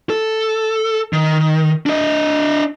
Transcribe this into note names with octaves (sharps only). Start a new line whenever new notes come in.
A4
D#3
D4 D#5